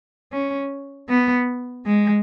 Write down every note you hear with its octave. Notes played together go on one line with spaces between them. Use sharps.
C#4
B3
G#3